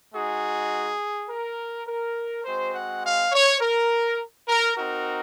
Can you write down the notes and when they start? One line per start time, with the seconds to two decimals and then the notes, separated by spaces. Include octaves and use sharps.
0.13 G#3 D#4 F#4 G#4
1.29 A#4
1.87 A#4
2.45 G#3 C4 F#4 C5
2.74 F#5
3.03 F5
3.32 C#5
3.61 A#4
4.48 A#4
4.77 C4 D#4 F#4 A#4